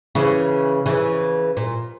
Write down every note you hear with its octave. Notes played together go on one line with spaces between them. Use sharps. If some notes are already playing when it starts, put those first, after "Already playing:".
C#3 E3
C#3 E3
A#2